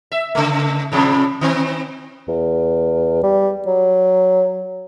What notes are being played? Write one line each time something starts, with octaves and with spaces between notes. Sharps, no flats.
E5
C#3 A3
A2 C3 F3
D#3 C4
E2
G3
F#3